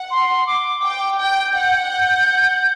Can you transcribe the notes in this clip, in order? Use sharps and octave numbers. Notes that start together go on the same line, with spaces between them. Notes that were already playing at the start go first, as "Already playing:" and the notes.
Already playing: F#5
C6
D6
G5
G5 G6
F#5